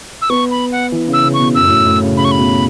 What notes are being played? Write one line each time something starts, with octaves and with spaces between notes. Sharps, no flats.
E6
B3 C#6
B5
F#5
E3
C#3
E6
C#3
C#6
B2
F#2 E6
A2
F#2
A2
C#3
C#3 B5
C#6
B5
B2